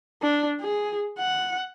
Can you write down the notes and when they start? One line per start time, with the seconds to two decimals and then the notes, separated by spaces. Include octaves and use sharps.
0.22 D4
0.61 G#4
1.19 F#5